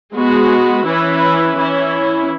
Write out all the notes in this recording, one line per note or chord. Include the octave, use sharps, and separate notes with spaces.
G#3 B3 F#4 B4
E3 C#4 E4 B4
E3 C#4 E4